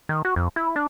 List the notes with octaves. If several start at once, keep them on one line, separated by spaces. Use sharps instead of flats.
D#3
F#4
F2
E4
D4